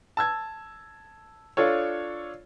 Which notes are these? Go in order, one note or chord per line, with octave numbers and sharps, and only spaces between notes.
A5 E6 G#6
D4 F4 A4 C#5